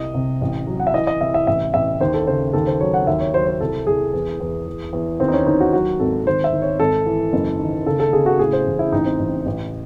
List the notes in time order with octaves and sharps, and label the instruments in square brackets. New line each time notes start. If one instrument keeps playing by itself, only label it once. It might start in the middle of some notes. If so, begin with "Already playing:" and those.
Already playing: [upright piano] C2 D#5
C3
A1
F#3
F#5
E5
E3 D#5
D#5
C2 E5
E5
A1 E5
A1 E5
D#2 C5
A4
C#3 C5
D#2 A4
C5
F#3 C#5
F#5
D#2 E5
C#5
F#3 C5
C5
C2 A4
C2 G#4
E2
E2
E2
E2
D#2 C4
D#4
C#4
D#2 D#4
F#4
F#3 F#4
G#1 A4
D#3 C5
E5
D#3
C#5
G#1 A4
E3
F#1
D#3
C#3 A4
A4
C#3 G#4
F#4
A2 G#4
C5
A1
E4
A1 D#4
C4
A1
A1